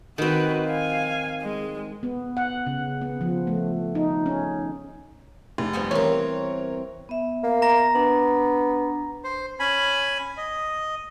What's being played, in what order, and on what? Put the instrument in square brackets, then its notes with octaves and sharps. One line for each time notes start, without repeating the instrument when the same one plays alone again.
[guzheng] D#3 C4 [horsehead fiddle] F#4 B4
[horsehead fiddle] F5 G#5
G#3
[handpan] B3
F#5
C#3
B3
F3
A3
D#4
C#4
[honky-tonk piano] F1
[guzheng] F3 G3 B3
[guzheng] E3 C4 [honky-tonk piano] A#4 C#5
[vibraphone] B3 E5
[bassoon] A#3
[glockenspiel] A#5 A#6
[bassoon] B3 [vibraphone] D4
[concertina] C5
C#4 G#5 B5
D#5